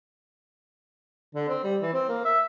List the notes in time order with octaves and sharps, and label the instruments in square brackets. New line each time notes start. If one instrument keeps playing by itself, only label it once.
[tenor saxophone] D3
C4
G3
E3
C4
A#3
E5